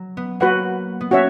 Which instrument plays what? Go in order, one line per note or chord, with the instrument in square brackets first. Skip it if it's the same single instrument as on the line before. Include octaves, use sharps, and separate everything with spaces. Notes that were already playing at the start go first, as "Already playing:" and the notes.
Already playing: [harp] F#3
B3
[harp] A#3 [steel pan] F#4 B4 F#5
[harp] B3
[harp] C#4 [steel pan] F#4 C#5 E5